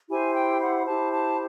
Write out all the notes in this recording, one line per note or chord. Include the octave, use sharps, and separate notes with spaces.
E4 G4 C5 G#5
G5
F#5
E4 G4 C5 A5
A5